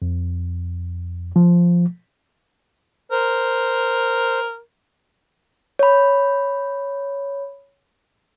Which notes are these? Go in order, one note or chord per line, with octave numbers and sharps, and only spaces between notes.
F2
F3
A#4 C5
C#5 B5